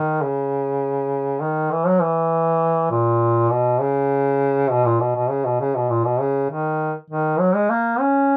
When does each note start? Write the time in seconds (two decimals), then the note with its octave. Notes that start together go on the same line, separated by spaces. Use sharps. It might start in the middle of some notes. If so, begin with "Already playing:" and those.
Already playing: D#3
0.22 C#3
1.42 D#3
1.71 E3
1.87 F#3
2.02 E3
2.91 A#2
3.51 B2
3.81 C#3
4.71 B2
4.86 A#2
5.00 B2
5.16 B2
5.30 C#3
5.46 B2
5.60 C#3
5.76 B2
5.90 A#2
6.05 B2
6.21 C#3
6.50 D#3
7.10 D#3
7.40 F#3
7.55 G#3
7.70 A#3
8.00 C#4